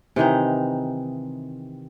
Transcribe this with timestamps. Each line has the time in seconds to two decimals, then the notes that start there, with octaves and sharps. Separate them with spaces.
0.16 C3 D#3 E3 D#4